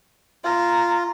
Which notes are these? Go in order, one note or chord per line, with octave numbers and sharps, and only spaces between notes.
F4 A#5